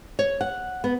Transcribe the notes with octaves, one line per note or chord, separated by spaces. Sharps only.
C#5
F#5
B3